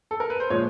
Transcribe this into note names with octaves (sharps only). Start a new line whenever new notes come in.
A4
A#4
B4
C5
A#2 F3 G#3 C#5